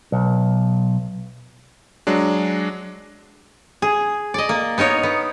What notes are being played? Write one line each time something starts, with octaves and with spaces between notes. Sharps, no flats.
B1
F#3 G#3 D4
G#4
D5 D#5
A#3
B3 D#4 A#4 C#5
B3